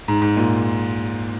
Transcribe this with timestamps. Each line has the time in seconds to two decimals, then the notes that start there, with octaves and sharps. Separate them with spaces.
0.08 G#2
0.22 G#2
0.37 A#2